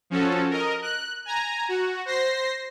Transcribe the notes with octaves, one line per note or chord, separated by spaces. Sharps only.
F3 C#4 F#4 A4
A#4 D#5
F#6
G#5 A#5
F#4
C5 A#6 C7